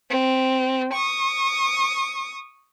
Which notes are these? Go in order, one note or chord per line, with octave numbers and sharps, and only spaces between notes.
C4
C#6 D#6